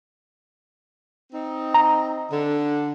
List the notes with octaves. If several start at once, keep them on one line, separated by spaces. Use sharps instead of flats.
C4 D#4
A#5
D3